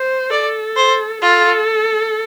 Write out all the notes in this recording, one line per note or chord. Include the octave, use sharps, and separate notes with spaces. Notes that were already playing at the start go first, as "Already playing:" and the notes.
Already playing: C5
A4 D5
C5
F4 A4